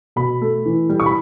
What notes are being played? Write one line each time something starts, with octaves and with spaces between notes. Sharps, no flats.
B2 B5
A3
E3
G3
C#6
B5